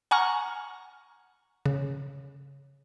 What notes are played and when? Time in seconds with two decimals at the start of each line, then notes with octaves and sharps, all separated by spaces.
0.11 F#5 G#5 A#5 C#6 F6
1.66 C#3